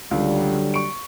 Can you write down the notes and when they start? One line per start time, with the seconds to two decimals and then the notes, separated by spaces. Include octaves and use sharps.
0.11 C#2 D3 F#3 G3
0.74 C#6 D7